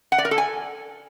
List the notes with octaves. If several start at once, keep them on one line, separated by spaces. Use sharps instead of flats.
F#5
D5
A#4
A4
G#5